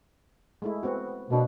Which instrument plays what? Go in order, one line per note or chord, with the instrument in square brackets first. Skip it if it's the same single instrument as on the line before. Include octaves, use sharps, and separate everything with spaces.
[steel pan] G#3 A3 E4
B3 C4 F#4
[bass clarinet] B2 [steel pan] A#3 C4 D4